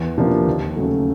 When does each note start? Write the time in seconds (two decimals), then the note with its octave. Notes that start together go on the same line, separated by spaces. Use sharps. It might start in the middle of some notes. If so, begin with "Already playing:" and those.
Already playing: E2
0.18 C3 F3 A#3 D4
0.47 D#2
0.77 C#3 F#3 A3